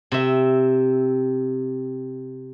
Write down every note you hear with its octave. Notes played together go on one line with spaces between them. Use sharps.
C3 E5